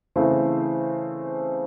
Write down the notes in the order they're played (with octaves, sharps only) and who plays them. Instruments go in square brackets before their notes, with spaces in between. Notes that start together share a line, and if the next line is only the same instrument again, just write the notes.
[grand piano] C#3 E3 A3 C4